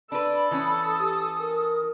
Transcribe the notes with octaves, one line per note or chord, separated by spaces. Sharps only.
D4 A4 B4 B5
E3 C#4 D#6
G4
A#4